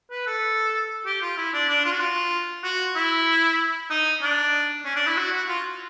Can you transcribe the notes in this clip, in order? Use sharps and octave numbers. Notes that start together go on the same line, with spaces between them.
B4
A4
G4
F4
E4
D4
D4
F4
F#4
F4
F#4
E4
D#4
D4
C#4
D4
E4
F#4
F#4
F4